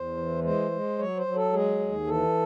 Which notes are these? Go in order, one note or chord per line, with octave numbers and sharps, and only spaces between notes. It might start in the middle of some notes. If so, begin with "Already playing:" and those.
Already playing: E2 C5
E3
G#3 C5
G#3
F#3 C#5
C5
F#3
A4
G#3 G#4
D#2
E3 A4